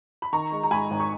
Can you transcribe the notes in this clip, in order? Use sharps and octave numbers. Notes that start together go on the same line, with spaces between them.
B5
D#3 A#5 C#6
G#3
A#5
G#2 G#5 B5
G#1
C#6